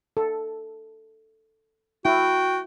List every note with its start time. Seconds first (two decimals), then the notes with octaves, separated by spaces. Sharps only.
0.17 A4
2.05 E4 F#4 G5